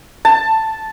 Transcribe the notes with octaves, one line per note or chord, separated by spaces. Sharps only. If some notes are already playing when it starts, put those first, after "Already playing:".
A5